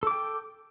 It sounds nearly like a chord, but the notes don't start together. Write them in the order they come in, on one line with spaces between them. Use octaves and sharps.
A4 D6 G5